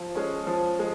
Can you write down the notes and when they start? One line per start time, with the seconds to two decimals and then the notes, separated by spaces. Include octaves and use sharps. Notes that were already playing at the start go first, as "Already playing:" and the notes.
Already playing: F3
0.15 G#3 C#4
0.47 F3
0.79 G#3